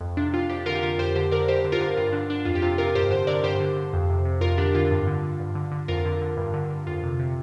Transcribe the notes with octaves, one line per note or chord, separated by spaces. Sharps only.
F2
C3 D4
C3 F4
F2 D4 G4
D3 F4 A#4
G4
D3 F4 A#4
F2 G4 C5
D3 G4 C5
D3 A#4 D5
G2 G4 C5
D3
F4 A#4
D3
G2 F4
D3 D4
D3 D4
F2 F4
G4
C3 F4
C3 F4 A#4
G2 G4 C5
D3 G4 C5
D3 A#4 D5
G2 G4 C5
D3
D3
F2
C3
C3
F2 F4 A#4
D3 D4 G4
D3 F4
G2
D3
D3
G2
D3
D3
F2 F4 A#4
D3
D3
G2
D3
D3
F2 F4
C3
C3